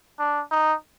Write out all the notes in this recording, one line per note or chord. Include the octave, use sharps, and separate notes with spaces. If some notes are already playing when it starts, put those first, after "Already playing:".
D4
D#4